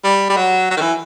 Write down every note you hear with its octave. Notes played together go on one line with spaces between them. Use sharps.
G3
G3
F#3
F#3
D#3
E3